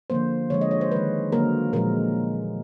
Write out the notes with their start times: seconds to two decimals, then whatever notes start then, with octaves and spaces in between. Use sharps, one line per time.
0.10 D3 F3 A#3 C5
0.50 D3 F3 G#3 C#5
0.61 D#5
0.71 C#5
0.81 C5
0.92 D#3 G#3 B4
1.32 D3 F#3 A#3 A#4
1.73 A#2 F3 G#3 A#4